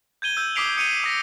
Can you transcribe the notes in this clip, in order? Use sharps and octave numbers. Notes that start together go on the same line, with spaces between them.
G6 G#6 D#7 G7
E6 G6
D6 D#6 B6 C7 D7 F7
D#6 C#7 D#7 F7 G7
D#6 A#6 B6